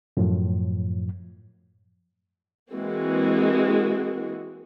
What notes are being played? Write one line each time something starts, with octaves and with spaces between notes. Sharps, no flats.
F#2 A2 F3
E3 G#3 A#3 C4 F#4